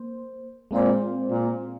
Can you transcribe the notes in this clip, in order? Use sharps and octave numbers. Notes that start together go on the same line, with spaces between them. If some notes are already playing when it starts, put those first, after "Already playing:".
Already playing: A#3 C5
A#2 G#3 C4 F4 C5
A#2